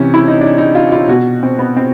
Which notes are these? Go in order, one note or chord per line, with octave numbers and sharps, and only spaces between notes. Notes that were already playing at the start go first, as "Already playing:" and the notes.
Already playing: C3 E3 C#4
E4
D#4
D4
D#4
F4
F4
B2 F#4
C4
B3
C4